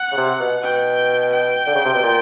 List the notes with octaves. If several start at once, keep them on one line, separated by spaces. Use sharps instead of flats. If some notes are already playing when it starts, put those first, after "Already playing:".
Already playing: F#5
C#3
C3
B2
B2 G5
G5
D3
C#3
C3
B2
A#2